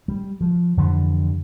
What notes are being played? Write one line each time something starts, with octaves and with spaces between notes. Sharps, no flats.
G3
F3
F2 D3 E3 G3